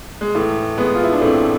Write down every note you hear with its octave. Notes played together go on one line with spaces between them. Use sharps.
G#3
A2 E3 A3
G#3 B3
F4
E4
D4
A2 E3 A3 C4